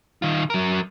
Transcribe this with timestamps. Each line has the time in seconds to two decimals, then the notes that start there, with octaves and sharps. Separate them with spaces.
0.22 D#3 F4
0.50 F#3 A#4